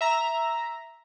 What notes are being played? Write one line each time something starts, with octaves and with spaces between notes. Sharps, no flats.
E5 A#5